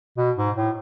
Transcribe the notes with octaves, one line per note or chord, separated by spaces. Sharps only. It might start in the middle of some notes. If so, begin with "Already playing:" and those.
B2
G#2
A2